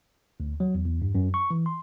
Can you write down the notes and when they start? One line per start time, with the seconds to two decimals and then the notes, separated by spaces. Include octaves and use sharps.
0.40 D2
0.60 F#3
0.75 E2
0.86 E2
1.02 G2
1.15 F#2
1.34 C#6
1.51 E3
1.66 C6